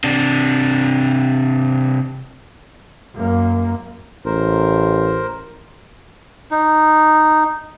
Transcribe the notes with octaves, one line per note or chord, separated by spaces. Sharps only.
C3 D4
F#2 A#3
A1 A#4 C5
D#4